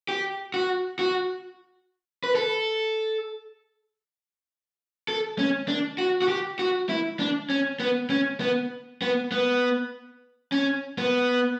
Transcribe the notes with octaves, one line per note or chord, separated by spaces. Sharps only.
G4
F#4
F#4
B4
A4
A4
C#4
D4
F#4
F#4
G4
F#4
E4
D4
C#4
B3
C#4
B3
B3
B3
C#4
B3